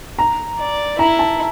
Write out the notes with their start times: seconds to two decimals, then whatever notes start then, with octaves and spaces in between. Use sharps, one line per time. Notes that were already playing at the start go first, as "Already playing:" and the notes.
0.19 A#5
0.58 D5
0.99 E4 A#5
1.19 A5